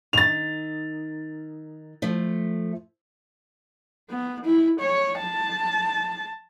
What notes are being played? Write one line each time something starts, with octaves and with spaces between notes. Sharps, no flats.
D#3 A6 F7
F3 A3
B3
E4
C#5
A5